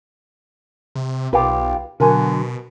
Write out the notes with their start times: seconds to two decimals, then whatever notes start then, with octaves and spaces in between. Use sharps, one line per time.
0.95 C3
1.33 B1 F4 G4 B4
2.00 B2 D3 F#3 A#4 G#5